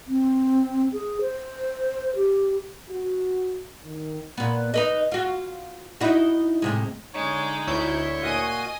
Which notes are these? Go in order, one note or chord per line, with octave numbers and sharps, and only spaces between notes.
C4
G#4
C5
G4
F#4
D#3
A#2 B3
D#4 B4 D#5
F4 F#4
D#4 E4 F#4
A2 C3 G#3
D3 G#3 D#4 C#5
D2 E4 C#5 G6
A#2 F#4 D#5 F5 G#5 D#6